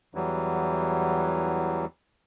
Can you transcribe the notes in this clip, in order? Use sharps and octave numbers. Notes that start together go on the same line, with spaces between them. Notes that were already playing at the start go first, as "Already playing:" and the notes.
E2 E3 F#3 G3